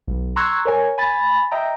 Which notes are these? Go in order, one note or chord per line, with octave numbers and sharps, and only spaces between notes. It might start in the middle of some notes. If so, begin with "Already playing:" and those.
B1
A#5 C6 C#6 E6 F#6 G#6
A#4 C#5 G#5
G#5 B5 A6
D#5 E5 G5 A#5